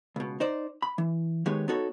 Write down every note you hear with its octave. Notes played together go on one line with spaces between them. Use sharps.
C#2 B2
D#4 C5 D5
B5
E3
D#3 G#3 B3 G4 C#5
B3 D#4 F#4 A4 C#5